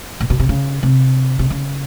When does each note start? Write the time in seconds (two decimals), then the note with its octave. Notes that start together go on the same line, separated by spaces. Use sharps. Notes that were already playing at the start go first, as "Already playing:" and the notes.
0.20 A#2
0.30 B2
0.40 C3
0.49 C#3
0.83 C3
1.39 C3
1.50 C#3